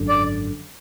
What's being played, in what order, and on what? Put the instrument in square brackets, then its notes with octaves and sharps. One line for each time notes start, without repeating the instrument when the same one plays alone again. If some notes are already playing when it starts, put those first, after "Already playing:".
Already playing: [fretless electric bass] G#1 F#2 D3
[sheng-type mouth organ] D5